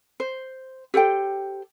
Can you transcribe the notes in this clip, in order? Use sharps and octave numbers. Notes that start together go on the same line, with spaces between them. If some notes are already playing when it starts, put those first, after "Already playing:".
C5
G4 A4 C5 G5